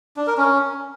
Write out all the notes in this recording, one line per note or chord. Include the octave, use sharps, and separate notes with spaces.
D4
A#4
C#4